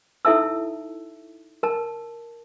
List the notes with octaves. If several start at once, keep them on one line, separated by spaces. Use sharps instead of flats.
D#4 E4 A4 E5 A5 E6
A#4 A5